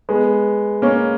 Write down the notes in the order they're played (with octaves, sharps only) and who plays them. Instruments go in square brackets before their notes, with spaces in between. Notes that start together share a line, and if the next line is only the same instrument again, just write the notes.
[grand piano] G#3 B3
A#3 C#4